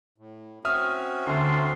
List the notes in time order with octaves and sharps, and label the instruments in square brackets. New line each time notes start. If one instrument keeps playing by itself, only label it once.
[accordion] A2
[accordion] C4 C#4 F#4 [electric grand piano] E5 D#6 F6
[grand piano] D2 D3 [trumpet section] A5 A#5 C6